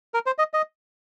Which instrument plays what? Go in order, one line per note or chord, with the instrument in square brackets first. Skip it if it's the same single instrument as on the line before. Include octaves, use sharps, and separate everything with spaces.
[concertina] A#4
C5
D#5
D#5